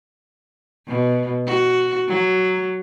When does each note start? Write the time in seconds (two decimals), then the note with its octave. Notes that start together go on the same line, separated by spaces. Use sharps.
0.87 B2
1.46 F#4
2.08 F#3